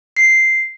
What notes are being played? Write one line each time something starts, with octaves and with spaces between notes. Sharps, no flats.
C7